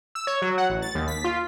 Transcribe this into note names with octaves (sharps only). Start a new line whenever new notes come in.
E6
C#5
F#3
F#5
A1
A6
D#2
B6
F4